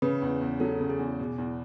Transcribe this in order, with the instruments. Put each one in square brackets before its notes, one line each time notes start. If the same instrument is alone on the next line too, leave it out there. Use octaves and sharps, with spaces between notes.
[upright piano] C#3 [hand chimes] B4
[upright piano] E2
E2
[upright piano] F#3 [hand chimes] A4
[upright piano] C#3
[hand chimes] G#4
[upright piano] E2
B2
E2